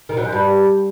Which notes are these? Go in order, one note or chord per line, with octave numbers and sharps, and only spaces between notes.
D#3
F#3
F#2
G2